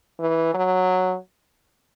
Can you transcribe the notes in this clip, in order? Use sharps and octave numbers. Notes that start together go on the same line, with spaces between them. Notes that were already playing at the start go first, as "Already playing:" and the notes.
E3
F#3